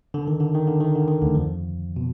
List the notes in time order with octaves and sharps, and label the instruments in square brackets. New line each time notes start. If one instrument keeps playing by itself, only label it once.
[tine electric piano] D3
D#3
D3
D#3
D3
D#3
D3
D#3
D2 D3
F2 F3
B2